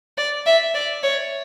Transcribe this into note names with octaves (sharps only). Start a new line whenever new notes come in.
D5
E5
D5
C#5